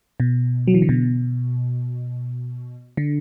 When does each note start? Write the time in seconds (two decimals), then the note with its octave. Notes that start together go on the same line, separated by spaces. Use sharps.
0.20 B2
0.68 F#3
0.74 E3
0.82 D3
0.89 B2
2.97 D3